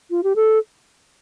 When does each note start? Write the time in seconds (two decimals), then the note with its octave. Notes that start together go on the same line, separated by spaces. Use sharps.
0.10 F4
0.23 G4
0.36 A4